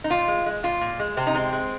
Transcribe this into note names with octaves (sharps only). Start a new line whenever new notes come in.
D#4
A#2 F4
G#3
G#3
A#2 F4
A#2
G#3
C3 C4
D#4
G#3 C4
G#3